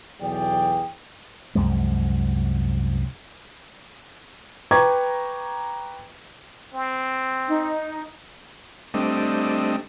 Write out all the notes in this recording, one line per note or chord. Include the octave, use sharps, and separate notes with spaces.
B1 E2 G#4 D5 G5
C2 F#2 F3 G#3
B4 G5 A#5 C#6 D6 G#6
C4
D#4
G3 A3 C4 D4 D#5